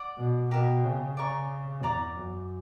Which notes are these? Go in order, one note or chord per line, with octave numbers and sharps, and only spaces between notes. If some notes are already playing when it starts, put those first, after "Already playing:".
Already playing: D5 F#5
B2
B2 G4 A#4 E5
C#3
C#3 D5 A#5 C#6
E2 D5 A#5 D6
F#2